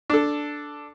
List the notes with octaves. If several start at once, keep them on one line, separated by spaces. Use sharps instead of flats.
D4 A4